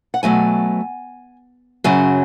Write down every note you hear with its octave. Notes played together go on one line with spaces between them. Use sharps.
F#5
B2 F#3 A3 G#5
F#2 C#3 F#3 G#5